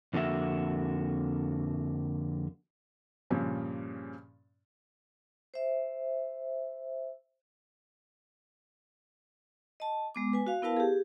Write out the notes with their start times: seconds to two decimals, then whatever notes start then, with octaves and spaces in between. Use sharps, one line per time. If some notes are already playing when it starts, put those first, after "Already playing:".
0.13 F2 D3 A#3 F#4 E5
3.30 G2 A#2 C#3 F3 C#4
5.54 C5 E5
9.80 D#5 A5
10.15 G#3 B3 D6
10.33 B4 G#5
10.47 F#4 F5
10.62 B3 E4 A#4 B4 F5 A5
10.77 G4 G#4